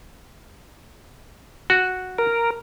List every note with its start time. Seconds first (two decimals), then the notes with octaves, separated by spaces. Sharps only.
1.70 F#4
2.19 A#4